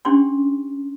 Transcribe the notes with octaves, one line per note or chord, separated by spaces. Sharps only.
C#4 D4 G4 C6 C#6